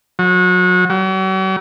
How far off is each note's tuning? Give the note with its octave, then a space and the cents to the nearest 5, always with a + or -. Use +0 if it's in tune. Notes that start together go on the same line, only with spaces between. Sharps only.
F#3 -30
F#3 +45